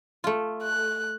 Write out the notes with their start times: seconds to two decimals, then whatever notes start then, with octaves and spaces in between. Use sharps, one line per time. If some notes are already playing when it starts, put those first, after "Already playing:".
0.24 A3 F4
0.63 F#6